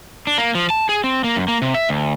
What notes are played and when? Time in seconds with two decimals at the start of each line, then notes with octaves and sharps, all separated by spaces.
0.27 D4
0.38 A#3
0.55 F3
0.70 A5
0.89 G#4
1.04 C4
1.24 A#3
1.36 F#2
1.48 A#3
1.62 C3
1.74 E5
1.89 D2